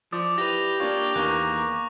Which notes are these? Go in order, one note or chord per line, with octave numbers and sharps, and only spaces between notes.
F3 D5 D6 D#6
E4 G4 B4 A#6 F7
A#3 D4 F4 C#5
E2 D#3 A#3 C#6 F#6